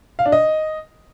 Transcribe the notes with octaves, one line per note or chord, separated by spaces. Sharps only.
F5
D4
D#5